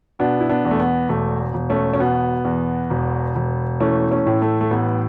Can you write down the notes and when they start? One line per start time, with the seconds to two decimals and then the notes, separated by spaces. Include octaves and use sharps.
0.19 B2 B3 D4
0.40 E4
0.49 B3 D4
0.65 E2
0.71 A3
0.80 B3
1.09 E1 A3
1.54 E1
1.70 A3 C#4
1.93 C#4
1.99 B2 B3
2.45 E2
2.90 E1
3.36 E1
3.80 E3 A3 C#4
4.11 A3 C#4
4.27 A2
4.42 A3
4.61 A3
4.71 A1 B3